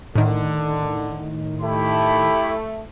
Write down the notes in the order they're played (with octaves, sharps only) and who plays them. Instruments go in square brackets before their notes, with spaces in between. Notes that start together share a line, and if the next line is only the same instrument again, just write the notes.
[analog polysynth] A2 D#3 [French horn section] D3
[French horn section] A3 [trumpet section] E4 G4 B5